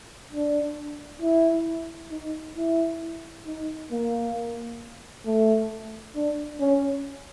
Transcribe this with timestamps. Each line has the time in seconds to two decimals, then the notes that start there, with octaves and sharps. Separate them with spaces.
0.32 D4
1.22 E4
2.11 D#4
2.57 E4
3.46 D#4
3.92 A#3
5.26 A3
6.16 D4
6.60 C#4